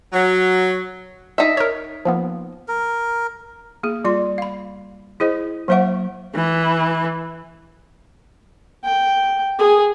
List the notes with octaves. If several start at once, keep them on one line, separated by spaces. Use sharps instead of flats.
F#3
D#4 E5
A#4 C#5
F3 A#3 B3
A#4
A#3 G#4
G3 F4 D5 C6
F5 B5
E4 G#4 C5 D#5
F#3 A#3 C5 E5 F#5 C#6
E3
G5
G#4